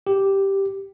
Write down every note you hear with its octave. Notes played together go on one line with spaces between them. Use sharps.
G4